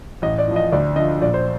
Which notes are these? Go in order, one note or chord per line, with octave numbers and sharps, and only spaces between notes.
A1 D#5
D5
A2 F3
D#5
D2 D5
D3 F3 D#5
A#1 D5
C5